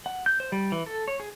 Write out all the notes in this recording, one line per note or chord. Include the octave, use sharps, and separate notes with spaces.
F#5
G6
C5
G3
E3
A4
C#5
G#4